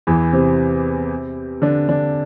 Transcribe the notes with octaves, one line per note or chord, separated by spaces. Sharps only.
E2 E3
C3 C4
D3 D4
D3 D4